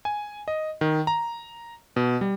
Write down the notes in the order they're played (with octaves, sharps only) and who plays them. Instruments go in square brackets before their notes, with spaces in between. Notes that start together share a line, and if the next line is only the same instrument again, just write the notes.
[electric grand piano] G#5
D#5
D#3
A#5
B2
G3